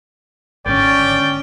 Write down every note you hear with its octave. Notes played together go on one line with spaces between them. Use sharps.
G#1 G#2 D3 C#4 D5 G5